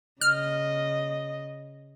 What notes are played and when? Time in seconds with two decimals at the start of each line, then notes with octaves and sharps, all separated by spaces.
0.21 C#3 D#5 F6